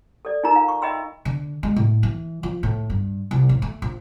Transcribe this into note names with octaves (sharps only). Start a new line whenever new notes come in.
A4 D5
D#4 F4 A#4 A#5
F5
C#6
D#5 E5 G5 B5 C6 E6
D3
G#3
A2
E3
F3
A2
G2
C2
A2
A3
A#1